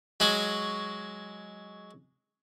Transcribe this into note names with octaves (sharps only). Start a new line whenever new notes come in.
F#3 G#3 F#4